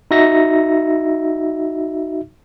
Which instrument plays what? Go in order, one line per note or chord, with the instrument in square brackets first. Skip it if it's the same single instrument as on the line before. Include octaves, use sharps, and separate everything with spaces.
[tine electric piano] D#4 F#4 E5 A#6